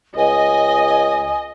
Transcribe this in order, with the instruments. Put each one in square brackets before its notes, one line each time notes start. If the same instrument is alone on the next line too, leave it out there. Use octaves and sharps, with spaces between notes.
[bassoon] C#2 [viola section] D#5 [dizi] G#5